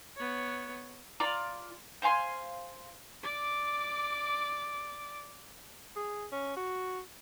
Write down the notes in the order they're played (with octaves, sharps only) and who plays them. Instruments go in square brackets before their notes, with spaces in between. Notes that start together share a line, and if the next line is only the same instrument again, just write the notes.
[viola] B3 C#5
[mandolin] F4 D5 A#5 D6
C5 F5 G#5 C6
[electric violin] D5 D6
[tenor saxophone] G#4
C#4
F#4